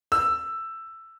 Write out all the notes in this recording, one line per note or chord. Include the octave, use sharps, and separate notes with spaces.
E6